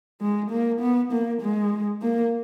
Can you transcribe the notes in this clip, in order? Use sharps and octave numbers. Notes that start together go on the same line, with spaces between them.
G#3
A#3
B3
A#3
G#3
A#3